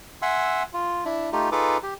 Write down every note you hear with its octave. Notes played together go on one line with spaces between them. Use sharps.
E5 F#5 G#5 C6 E6
F4
D4 E4
A3 D#4 F4 G4
D#4 F4 G#4 A4 B4 D6
G4